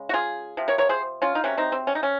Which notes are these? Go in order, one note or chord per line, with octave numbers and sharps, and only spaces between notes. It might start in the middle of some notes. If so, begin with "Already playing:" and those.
Already playing: C#3 G#3
F#4
F4 G#4
C3 F3
A#4 C#5
A#4 C#5
G#4 C5
C#4 F4
D#4
C3 F#3 A#3 C#4
C4 D#4
C4
C#4
D#4
C#4